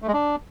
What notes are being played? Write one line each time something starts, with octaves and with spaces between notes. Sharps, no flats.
A3
G#3
D4